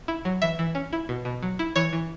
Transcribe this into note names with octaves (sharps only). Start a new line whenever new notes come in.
E4
F#3
E3 E5
E3
C#4
E4
B2
B2
F#3
E4
E3 C#5
E3